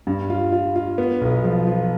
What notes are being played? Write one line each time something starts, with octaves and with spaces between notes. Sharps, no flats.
G2
F4
F4
F4
B3
B1
F3
F3